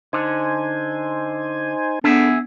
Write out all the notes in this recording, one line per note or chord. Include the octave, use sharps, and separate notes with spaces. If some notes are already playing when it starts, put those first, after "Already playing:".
D3 D#4 C5 G#5
B3 D4 G#4 A4 E5